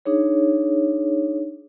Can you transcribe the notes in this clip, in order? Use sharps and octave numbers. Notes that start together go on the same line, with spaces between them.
D4 D#4 G#4 C#5